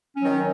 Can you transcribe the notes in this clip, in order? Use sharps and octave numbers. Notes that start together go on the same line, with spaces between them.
D#3 F#3 C#4